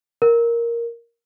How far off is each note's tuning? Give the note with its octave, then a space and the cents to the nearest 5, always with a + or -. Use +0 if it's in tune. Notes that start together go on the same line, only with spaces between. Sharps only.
A#4 +5